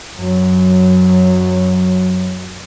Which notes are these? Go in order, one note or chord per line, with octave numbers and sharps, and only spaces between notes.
F#2 F#3